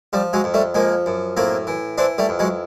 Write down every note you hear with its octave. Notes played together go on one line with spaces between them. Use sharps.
F3 G3
F#3 G#3
F2
G3 A3
F3 G#3 A#3
F#2
A2 A#3 C4
E3
E3 C4 D4
G3 A3
F2
F#3 G#3